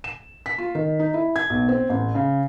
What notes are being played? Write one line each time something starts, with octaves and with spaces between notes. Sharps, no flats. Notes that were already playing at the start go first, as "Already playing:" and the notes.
E7
B6
F4
D#3
D#4
E4
G#6
B1
C4
A1
C#3